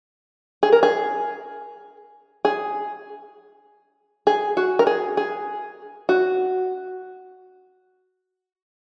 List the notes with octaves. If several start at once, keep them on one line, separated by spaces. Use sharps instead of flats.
G#4
A#4
G#4
G#4
G#4
F#4
A#4
G#4
G#4
F#4